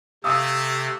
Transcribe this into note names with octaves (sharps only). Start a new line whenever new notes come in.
C3 A3 F5 D#6 E6